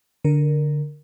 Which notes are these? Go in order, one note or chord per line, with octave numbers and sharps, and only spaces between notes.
D3 A#4